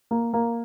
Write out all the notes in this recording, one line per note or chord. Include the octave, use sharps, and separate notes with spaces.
A#3
A#3